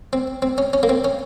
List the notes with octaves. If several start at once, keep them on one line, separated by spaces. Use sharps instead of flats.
C4
C4
C#4
C#4
A#3
C4
C#4